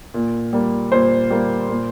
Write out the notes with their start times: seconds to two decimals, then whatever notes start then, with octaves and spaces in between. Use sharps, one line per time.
0.14 A#2
0.53 G3 A#3
0.92 A#2 C5
1.30 G3 A#3
1.69 A#2